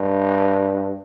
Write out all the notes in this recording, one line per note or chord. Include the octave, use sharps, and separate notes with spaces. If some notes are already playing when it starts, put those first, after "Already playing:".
Already playing: G2